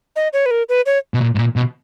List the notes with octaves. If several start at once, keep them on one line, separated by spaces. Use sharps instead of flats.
D#5
C#5
B4
A#4
B4
C#5
B2
A#2
G#2
A#2
B2